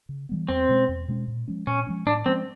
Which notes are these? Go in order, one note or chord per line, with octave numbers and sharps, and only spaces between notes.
C#3
E3 G3 B3
E2 C4
B2 G#3 C#4
E2
B2 G#3 C#4
A#2
F3 G#3 C#4
A#2 C#4
F3 G#3 C#4
A2 D4
F3 G#3 C4 C#4